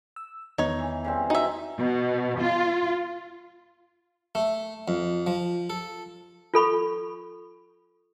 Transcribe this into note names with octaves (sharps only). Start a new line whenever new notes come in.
E6
E2 D#3 B3 D#4 C#5
E3
C#3 G3 C4
D#4 F#4 E5
B2
F4
A3
F2
F3
A4
F4 A4 B5 C#6